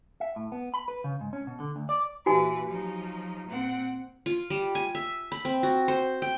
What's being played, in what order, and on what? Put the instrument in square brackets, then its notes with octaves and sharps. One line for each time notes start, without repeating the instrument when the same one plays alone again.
[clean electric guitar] E5
A2
B3
B5
B4
C#3
G#2
C#4
B2
D3
D2
D5
[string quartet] A#2 E3 B4 [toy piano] F#4 G4 G#5
[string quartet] F3 F#3 D#4
A#2 C4 F#5
[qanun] F4
G3
G#5
E5
B5
C4
F#4
C5
G5